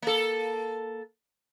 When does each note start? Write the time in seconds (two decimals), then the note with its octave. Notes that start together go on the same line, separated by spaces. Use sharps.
0.02 A#3 A4